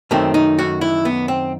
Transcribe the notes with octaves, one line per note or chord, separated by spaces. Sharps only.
F#2 D#3 A3 C4
D#4
F#4
E4
B3
C4